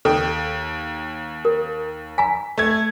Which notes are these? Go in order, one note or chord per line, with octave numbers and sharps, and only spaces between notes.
D#2 A4 G5
A#4
G#5 A#5 B6
A3 G#6